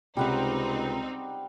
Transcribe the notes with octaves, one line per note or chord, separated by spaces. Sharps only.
C#2 C3 G3 C4 D#4 G4 F#5